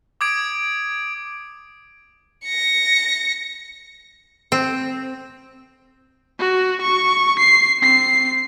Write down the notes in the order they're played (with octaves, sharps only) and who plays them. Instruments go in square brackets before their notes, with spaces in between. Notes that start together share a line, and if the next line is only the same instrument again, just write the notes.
[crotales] D6 D#6 G#6 D7
[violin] A#6 C#7
[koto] C4
[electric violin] F#4
C#6
C7
C4 C7